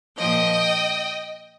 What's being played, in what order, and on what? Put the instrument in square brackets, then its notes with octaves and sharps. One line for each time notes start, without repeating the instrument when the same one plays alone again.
[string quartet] A#2 F3 D#5 G5